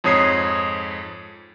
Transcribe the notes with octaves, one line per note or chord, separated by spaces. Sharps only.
F2 G#2 C#5 D#6 G#6 C7